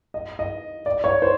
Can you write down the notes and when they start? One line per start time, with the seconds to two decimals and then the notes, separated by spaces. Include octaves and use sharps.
0.14 D#5
0.39 D#5
0.86 D5
1.04 C#5
1.22 C5